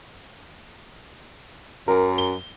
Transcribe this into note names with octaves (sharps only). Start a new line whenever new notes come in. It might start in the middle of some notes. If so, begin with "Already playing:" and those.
F#2 A#4
G7